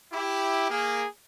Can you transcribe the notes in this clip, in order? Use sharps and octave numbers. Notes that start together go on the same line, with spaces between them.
E4 G4
A#3 G#4